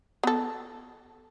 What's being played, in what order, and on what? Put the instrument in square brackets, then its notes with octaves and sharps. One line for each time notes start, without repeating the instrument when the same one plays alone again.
[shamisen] B3 A4